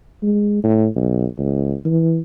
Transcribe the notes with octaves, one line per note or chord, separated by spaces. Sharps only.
G#3
A2
B1
C#2
E3